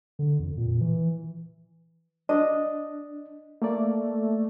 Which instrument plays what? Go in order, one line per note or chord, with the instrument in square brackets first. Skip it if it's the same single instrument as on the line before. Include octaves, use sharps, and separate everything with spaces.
[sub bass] D3
F2
A#2
E3
[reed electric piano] D4 [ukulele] D#5
[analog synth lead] A3 [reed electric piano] A#3 D5